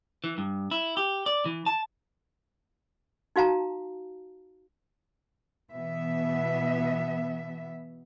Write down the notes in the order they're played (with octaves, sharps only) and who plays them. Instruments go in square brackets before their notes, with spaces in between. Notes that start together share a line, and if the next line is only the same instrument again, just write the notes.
[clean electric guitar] E3
G2
E4
G4
D5
E3
A5
[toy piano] D#4 F#4 F5 A5 A#5
[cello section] B2 E3 B3 E5